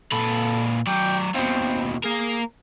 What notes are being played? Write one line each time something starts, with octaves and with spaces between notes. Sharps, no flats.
A#2 A4 B4
F#3 D5 G5
D#2 B2 C4
A#3 G#4 A#4